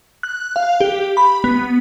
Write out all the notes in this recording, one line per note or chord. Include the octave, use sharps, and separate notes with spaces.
F#6
F5
G4
B5
B3